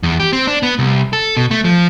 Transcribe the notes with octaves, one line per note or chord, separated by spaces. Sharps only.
E2
G4
C4
D4
B3
C2
A4
B2
A3
F3